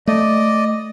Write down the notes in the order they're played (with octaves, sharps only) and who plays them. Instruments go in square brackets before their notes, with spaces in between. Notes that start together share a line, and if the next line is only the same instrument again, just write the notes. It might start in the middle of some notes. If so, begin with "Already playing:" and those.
[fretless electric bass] A3 [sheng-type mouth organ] D5 D#5